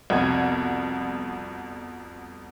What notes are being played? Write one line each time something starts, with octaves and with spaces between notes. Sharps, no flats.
C2 F2 B2 B3 G#6